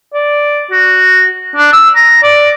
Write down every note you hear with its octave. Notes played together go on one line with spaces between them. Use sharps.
D5
F#4
D4
E6
A#5
D5